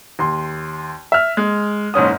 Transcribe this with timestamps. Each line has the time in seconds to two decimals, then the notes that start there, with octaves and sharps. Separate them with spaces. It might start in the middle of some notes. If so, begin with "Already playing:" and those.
0.19 D#2 C6
1.12 E5 F6
1.37 G#3
1.94 F#1 G#2 C#4 D#6